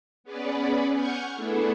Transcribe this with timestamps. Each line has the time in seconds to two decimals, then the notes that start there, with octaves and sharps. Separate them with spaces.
0.24 B3 C#4 G#4 B4 D5
0.93 F#5 G#5 C#6 F6 G6 G#6
1.35 A3 B3 D4 E4 G#4 A4